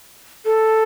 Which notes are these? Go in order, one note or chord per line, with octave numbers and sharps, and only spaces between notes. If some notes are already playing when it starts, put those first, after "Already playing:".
A4